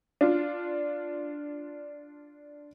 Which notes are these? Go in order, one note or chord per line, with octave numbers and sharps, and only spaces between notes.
D4 F4